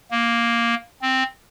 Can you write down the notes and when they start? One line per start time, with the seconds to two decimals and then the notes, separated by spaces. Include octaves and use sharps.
0.11 A#3
1.02 C4